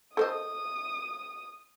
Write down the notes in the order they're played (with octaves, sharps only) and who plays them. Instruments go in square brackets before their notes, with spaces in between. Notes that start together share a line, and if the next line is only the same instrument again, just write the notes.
[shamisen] A4 C5 D#5 [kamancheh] D#6